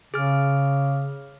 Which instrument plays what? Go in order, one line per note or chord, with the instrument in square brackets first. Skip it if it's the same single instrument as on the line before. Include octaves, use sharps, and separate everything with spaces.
[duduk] C#3 [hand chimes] G#4 F6